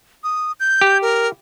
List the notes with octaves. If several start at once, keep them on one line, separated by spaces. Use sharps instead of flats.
D#6
G6
G4
A#4